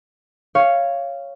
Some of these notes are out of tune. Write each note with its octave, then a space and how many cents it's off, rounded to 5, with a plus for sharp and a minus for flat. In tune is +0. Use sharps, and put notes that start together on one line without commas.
C#5 +0 F5 -10